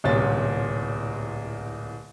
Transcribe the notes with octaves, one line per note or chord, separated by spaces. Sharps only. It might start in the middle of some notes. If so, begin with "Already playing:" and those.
D1 C2 A#2 C#4 A6